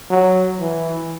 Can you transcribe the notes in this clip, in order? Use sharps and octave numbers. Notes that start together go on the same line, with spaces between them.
F#3
E3